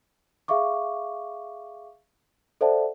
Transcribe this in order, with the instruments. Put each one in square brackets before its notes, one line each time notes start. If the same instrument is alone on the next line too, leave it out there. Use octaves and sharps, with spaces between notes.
[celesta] G#4 E5 F5 C#6 D6
A4 C5 D5 E5 F#5 A5